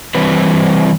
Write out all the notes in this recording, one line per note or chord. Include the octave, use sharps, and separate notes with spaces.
E3 G3 C4 B4